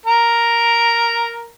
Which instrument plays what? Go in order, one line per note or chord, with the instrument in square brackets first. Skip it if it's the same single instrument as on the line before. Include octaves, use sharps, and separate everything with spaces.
[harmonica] A#4 A#5